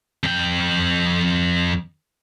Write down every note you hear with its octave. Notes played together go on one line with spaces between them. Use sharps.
F2 G5